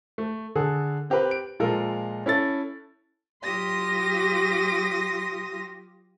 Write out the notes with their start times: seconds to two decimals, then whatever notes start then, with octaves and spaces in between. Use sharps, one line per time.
0.18 A3
0.55 D3 G#4 A4
1.10 C4 G4 A#4 B4 B5
1.31 D7
1.60 A#2 F3 G#3 F4 A4 A#4
2.26 C#4 E4 A4 A6
3.43 F#3 F4 G4 C6 D#6 A#6